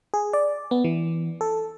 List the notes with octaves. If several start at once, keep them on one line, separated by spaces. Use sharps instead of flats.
G#4
D5
B3
E3
A4